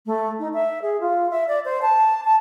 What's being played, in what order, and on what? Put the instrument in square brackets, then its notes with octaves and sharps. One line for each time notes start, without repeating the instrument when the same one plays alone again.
[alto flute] A3
D#4
E5
G#4
F4
E5
D5
C5
A5
A5